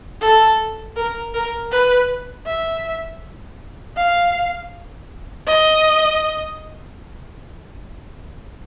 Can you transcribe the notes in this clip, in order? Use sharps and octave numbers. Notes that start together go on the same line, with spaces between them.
A4
A#4
A#4
B4
E5
F5
D#5